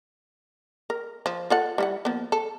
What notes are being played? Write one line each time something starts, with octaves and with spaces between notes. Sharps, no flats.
A#4
F3
F4 A4 F#5
G3 E4 F#5
F3 A#3 B3
A4